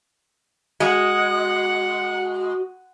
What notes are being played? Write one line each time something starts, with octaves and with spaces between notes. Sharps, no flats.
G#3 F#4 F#5